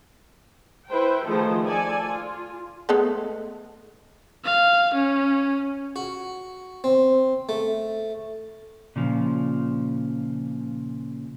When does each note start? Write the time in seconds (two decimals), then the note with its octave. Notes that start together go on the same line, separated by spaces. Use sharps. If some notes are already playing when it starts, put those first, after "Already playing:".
0.88 E4 B4 C5 G5
1.26 D#3 F3 A3 G#4 A4 C5
1.64 A4 D5 G#5
2.10 F4
2.89 G#3 A3 B3
4.45 F5
4.94 C#4
5.96 F#4
6.84 C4
7.49 A3
8.96 A#2 C#3 F3